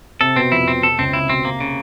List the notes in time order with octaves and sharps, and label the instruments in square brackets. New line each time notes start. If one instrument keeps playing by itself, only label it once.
[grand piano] C3 C4 [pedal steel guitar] A4
[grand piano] B2 B3 [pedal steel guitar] C4
[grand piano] F2 F3 [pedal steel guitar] E4
[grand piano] B2 [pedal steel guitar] C4
[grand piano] C3 [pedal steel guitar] A4
[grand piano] C#2 C#3 [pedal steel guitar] C4
[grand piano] C3 [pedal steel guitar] E4
[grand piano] B2 [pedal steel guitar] C4
[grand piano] C3 [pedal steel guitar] A#3
[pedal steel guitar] C#3